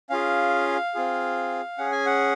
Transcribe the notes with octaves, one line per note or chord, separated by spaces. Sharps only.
C#4 F4 G#4 F5
C4 F4 G#4
C#4 G#4 F#5
G#5
F#5